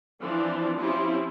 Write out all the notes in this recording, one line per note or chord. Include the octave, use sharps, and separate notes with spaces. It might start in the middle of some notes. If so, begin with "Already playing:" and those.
E3 F3 C4 D4 C5
F3 C4 C#4 E4 F4 G4